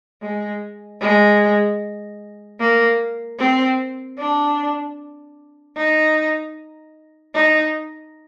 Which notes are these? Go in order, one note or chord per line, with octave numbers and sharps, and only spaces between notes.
G#3
G#3
A#3
C4
D4
D#4
D#4